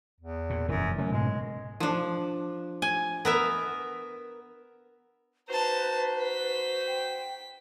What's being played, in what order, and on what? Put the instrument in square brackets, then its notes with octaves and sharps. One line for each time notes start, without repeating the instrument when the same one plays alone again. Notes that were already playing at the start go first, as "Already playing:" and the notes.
[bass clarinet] E2
[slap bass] A#2
[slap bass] F1 E3 [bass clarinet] F#2
[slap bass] C#3 F#3 A3 [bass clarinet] C#4
[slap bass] G#2 B2 [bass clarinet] G#3
[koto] F3 D4
G#5
B3 A#4 E5
[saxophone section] D#4 F#4 C5 [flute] B4 [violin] A5 A#5
[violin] B6
[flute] G5